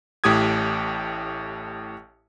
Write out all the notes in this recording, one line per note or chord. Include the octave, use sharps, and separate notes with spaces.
A1 A2 G4 D#6 G#6